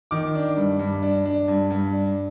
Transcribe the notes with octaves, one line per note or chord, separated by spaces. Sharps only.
D#3 D6
D4
G2
G2
D4
D4
G2
G2
D4